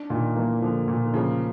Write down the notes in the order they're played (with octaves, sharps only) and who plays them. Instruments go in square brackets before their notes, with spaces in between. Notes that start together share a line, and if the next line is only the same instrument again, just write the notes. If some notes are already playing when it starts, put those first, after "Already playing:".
Already playing: [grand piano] D4
[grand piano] A#2 [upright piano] D#3
[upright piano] E3 [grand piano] A#3
[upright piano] D3 [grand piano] F3
[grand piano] A#2
[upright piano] D3
[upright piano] C#3 [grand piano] F3